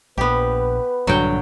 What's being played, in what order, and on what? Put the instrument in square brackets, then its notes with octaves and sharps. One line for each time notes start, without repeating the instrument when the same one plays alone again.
[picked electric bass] A#1 [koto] B3 G4 [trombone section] B4
[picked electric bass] A#1 G2 D3 [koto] F#3 G5